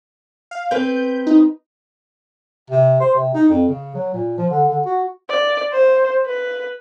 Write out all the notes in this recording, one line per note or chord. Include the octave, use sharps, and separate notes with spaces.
F5
C4 B4 G6
D#4
C3
C5
C3
D#4
F2
C#3
F#3
A#2
F3
D3
D3
F#4
D5
C5
B4